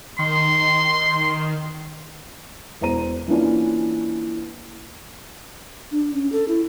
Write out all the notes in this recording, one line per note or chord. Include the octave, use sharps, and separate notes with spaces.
D#3 C6
E1 E2 C5 A#5 D#7
E3 A#3 C#4 D4 F4
D4
C#4
A4
E4